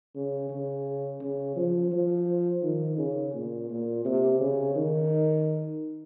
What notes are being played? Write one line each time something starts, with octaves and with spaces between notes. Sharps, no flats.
C#3
C#3
C#3
F3
F3
D#3
C#3
A#2
A#2
C3
C#3
D#3